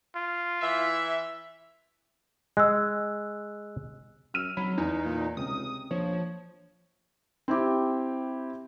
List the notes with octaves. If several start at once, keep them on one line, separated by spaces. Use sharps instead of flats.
F4
E3 E4 E5
G#3 E6 F#6
F#2 E6 F6 D#7
G#1 F#3 B5
E2 D#4
A#2
C#2 C3 D#6
A#1 F3 C#5
C4 E4 G4